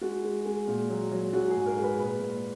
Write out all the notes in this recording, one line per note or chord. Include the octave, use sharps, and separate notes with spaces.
G#3 F#4
G#3
G#3
A#2
F#3
F#3
G#3 F#4
G#2 G#4
A#4
G#3
B4
A#2 B4
A#2